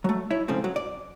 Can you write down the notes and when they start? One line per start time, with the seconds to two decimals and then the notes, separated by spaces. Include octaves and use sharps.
0.04 F#3 A3
0.30 E4 C#5 E5
0.48 G#2 C#3 F3 A3 C4
0.64 F#3
0.76 D5